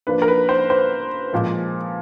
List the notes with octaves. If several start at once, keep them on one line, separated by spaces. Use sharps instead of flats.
F3 A#3 D4 B4
A#4
B4
C5
C5
A#2 F3 G#3